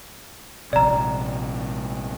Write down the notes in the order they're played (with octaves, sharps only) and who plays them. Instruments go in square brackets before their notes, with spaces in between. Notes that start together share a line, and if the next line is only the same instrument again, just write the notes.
[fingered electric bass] A#1 C3 [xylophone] D5 A#5